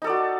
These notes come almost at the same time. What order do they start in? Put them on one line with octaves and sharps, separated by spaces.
D#4 A4 D5 F#4